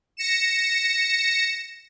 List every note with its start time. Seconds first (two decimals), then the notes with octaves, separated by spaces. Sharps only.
0.17 A#6 C#7 E7